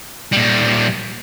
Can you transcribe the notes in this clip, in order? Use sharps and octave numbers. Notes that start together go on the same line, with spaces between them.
A#2 G3